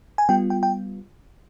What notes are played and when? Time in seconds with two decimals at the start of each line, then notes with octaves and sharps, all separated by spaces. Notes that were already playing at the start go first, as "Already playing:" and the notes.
0.18 G#5
0.29 G3 B3 F4 G5
0.50 G5
0.63 G5